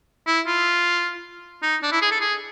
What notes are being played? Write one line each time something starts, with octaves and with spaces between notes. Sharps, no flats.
E4
F4
D#4
D4
E4
G#4
A4
G#4